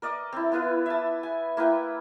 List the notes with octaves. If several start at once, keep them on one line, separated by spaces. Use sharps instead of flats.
A#4 D5 D#5 D6
C4 E4
B3 E4 F4 B4
E5 A5
G#5
A#3 E4 B4 G5